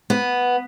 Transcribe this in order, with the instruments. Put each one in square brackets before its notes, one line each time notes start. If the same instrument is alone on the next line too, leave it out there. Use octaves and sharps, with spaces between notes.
[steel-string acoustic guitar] B3